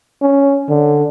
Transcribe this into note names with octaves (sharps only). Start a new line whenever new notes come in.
C#4
D3